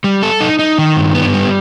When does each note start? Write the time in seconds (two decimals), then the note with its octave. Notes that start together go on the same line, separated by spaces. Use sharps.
0.04 G3
0.23 A4
0.41 D#4
0.59 D#4
0.78 D#3
0.97 G2
1.15 B3
1.33 G3